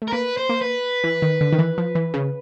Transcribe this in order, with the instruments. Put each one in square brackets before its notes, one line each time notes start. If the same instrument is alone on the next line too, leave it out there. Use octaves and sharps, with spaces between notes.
[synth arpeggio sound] A3
[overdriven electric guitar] A#4
[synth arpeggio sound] A#3 [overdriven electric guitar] B4
[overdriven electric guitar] C5
[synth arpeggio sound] A#3
[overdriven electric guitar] B4
[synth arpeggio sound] E3
D#3
D3
D#3
E3
F3
E3
C#3